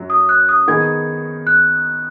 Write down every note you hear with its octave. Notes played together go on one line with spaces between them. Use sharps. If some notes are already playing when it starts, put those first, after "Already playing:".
Already playing: F#2 F#3
D#6
F#6
D#6
D#3 B3 D#4 G#4 G#6
F#6